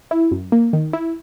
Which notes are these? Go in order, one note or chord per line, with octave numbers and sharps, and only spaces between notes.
E4
F#2
A#3
D#3
E4